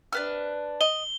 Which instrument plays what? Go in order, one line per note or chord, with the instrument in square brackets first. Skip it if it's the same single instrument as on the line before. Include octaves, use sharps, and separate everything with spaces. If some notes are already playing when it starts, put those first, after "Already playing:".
[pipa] C3 [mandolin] D4 B4 F6
[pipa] D#5 [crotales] G7